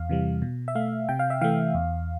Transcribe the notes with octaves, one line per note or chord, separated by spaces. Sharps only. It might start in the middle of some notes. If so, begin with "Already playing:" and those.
Already playing: E2 F5
C3 E3 G3
B2
E5
A3 F5
C3 G5
F5
E5
E3 A3 F5
E2